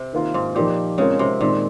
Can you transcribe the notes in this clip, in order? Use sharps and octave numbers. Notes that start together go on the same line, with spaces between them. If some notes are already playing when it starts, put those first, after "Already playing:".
Already playing: C3
D#3 A#3 F4 A#4
G#2
A#2 F3 A#3 D#4 G4
C#3 G#3 C4 F4 A#4
C3
A#2 D#3 G#3 C4